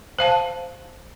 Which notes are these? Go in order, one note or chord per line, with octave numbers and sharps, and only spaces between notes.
C5 F5 A5